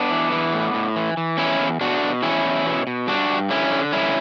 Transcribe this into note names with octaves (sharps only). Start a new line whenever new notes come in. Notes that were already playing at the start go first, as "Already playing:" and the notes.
Already playing: B3 D4
E3
E3
A2
A2
E3
E3
E2 C#4 E4
E2
B2 D4 F#4
B2
E2 C#4 E4
E2
B2
B2
G2 D4 F#4
G2
D3 C#4 E4
D3
G2 C#4 E4